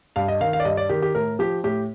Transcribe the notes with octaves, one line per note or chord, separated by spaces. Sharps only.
G2 F5
D#5
D#3 F5
F5
D5
G2 D#5
D5
D#3 G4
G4
A2 A#4
F3 G4
A2 G4